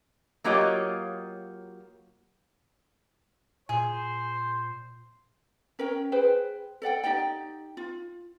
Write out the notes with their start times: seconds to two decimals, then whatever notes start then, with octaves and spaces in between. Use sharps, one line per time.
0.44 F#3 A#3 F4 G4 C#5 D#5
3.69 A#2 G#4 C5
5.79 C#4 A#4 C#5 G5
6.12 G#4 B4 C5 G5
6.82 A4 D5 F#5 G5
7.04 D#4 G4 D5 G5
7.77 F4